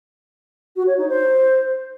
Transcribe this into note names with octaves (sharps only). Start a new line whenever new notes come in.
F#4
C#5
D#4
C5